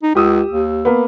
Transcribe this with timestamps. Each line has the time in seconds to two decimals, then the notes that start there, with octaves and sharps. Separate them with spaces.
0.03 D#4
0.15 C#2 G4 D#6 E6
0.51 D#2
0.85 A#3 B3